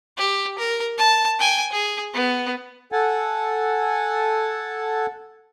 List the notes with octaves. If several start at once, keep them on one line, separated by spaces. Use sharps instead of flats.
G4
A#4
A5
G5 G#5
G#4
B3
A4 F#5 G#5 A5